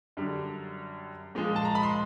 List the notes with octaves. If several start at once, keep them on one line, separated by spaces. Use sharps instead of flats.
F#2 D3 G3
A#2 F3 G#3
A5
A#5
B5
C6